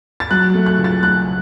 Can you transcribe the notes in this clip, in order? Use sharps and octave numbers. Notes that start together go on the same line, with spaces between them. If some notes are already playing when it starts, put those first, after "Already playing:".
A6
F#3 F#6
A3
F#6
C#2
A6
A3 F#6